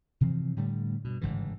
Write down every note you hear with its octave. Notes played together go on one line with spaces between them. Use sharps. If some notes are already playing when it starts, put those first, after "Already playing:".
C3 E3 F3 C4
A2 D3 G3 A3
G2 B2
G1 G#2 C#3 E3